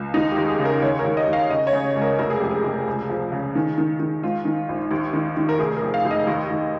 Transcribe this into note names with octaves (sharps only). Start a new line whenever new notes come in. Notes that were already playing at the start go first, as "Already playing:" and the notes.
Already playing: C#2
D#2 D#4
D#2 G4
G#4
C#3
A#4
D#2 C#5
A#4
D#2
D#5
D#2
F5
C#3 D#5
C#5
C#3
C#2
A#4
F1 A#4
G#4
F2 G4
G#4
F1
C#2
F3
C#3
D#3
D#3
D#3
G#2 F4
D#3
A#1
D#2
D#3
D#3
A#4
F1 G#4
A#4
F2
F5
F1
D#5
D#2
D#2